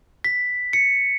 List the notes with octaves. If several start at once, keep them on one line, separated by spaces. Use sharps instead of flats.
B6
C#7